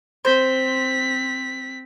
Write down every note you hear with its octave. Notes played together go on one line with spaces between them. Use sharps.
C4 C5 B6